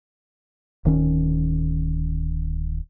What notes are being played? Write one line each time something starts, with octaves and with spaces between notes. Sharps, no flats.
D1 D#3 C#4